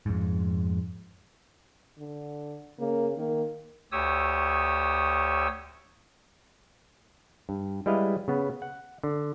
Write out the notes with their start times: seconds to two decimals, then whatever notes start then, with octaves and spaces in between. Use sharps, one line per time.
0.06 F2 G#2
1.99 D3
2.79 C#3 A#3
3.17 D#3 A#3
3.92 D2 G4 C#5 D#6 E6
7.49 G2
7.86 G3 G#3 E4 B4 D#5 F5
8.28 C#3 B3
8.62 F#5
9.03 D3